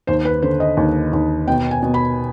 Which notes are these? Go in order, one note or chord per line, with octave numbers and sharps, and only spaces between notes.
D#2 C5
B4
D3 C5
D#5
D#2
D#2
B2 G5
G#5
B2
B5